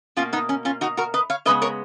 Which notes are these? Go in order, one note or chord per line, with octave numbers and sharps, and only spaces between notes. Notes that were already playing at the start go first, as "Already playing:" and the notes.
B2 A#3 C#4 F4
B3 D#4
C#4
C#4 F4
D#4 F#4
F#4 A#4
B4 D#5
C#5 F5
C#3 G#3 B3 B4 D#5
A#4 C#5